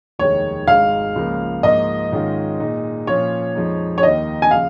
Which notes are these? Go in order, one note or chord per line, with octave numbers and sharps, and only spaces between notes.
F1 D#2 D#3 G#3 C#5
G#1 G#2 G#3 D#4 F5
C#2 C#3 F3 A#3
G#2 F3 A#3 D#5
G#2 D#3 G#3 C#4 F4
A#2 G#3 D#4
A#2 F3 C#4 F4 C#5
F2 F3 G#3 D#4
C#5
D#2 D#3 A#3 D#4 D#5
G#5
C#3 F3 F5